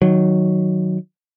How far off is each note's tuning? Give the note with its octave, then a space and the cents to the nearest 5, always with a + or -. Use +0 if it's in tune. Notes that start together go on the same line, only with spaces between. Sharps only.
D#3 +0 F#3 +0